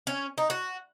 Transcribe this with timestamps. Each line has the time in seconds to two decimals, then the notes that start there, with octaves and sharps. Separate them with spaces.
0.07 C#4
0.38 D#4
0.50 F#4